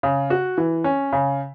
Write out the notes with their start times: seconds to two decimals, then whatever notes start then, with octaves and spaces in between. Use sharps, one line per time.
0.03 C#3
0.30 F#4
0.58 E3
0.84 C#4
1.13 C#3